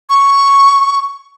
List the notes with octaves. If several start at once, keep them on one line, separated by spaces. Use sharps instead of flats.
C#6